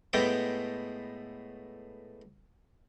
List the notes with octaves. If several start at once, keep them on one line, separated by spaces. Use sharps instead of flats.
A2 G#3 A3 B3 G5 D6